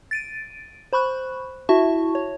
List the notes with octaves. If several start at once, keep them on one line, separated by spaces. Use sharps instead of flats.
A6 D7 D#7
C5 B5 C#6 F#6
E4 F#4 E5 A5 C#6
C#5